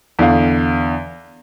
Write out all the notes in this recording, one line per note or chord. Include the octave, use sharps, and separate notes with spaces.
E2 D3 F5